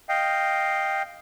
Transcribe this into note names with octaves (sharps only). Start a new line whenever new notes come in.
D#5 F5 G5